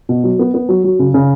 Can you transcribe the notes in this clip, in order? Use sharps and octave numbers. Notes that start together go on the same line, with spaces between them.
B2
F#3
B3
B3
F#3
F#3
C#3
C#3